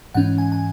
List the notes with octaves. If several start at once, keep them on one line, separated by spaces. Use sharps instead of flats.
G#2 E3 C#4 F#5
G#5
G#5